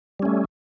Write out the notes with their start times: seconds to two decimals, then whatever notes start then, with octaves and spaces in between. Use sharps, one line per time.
0.19 G3
0.22 C#4
0.25 A3